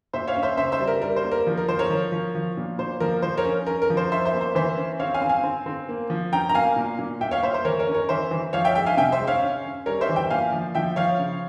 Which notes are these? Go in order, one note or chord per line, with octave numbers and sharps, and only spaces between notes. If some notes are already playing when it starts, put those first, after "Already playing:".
A#2 C5 E5
C#5 F5
C#4
C5 E5
C#3 C5 E5
C5 E5
G3
A#4
G3 A#4
C5
A#3
A#4
F3
A#4
F3 C5
A#4 C#5
F3
F3
F3
A#2
A#2 C5
F3 A#4
F3 C5
A#4 C#5
C#4
C#4 A#4
A#4
F3
C5
C#4 C5 E5
C5 E5
A#3
C5
E3 C5 E5
C#4
C4 C#5 F5
F5 G#5
C4
F5 G#5
C4
C4
A#3
F3
C#4 G5 A#5
A#5
A#3 F5 G#5
A#2
A#2
A#2 E5 G5
C#5 F5
A#2 C5 E5
C5
E3 A#4 C#5
A#4 C#5
C#4
A#4 C#5
E3 C5 E5
E3
F3 C#5 F5
E5 G5
G#3 E5 G5
F5 G#5
C3 E5 G5
C5 E5
G#3
C#5 F5
C#4
C#4
G3 A#4 C#5
C5 E5
E3
E5 G5
A#2 F5 G#5
F3
F3 E5 G5
F3 C#5 F5
C#3